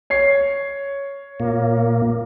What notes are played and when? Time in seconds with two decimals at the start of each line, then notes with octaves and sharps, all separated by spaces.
0.10 C#5 C7
1.40 A#2 A#3